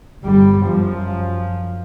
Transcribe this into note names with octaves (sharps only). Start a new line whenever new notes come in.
G1 G3
F#2 F3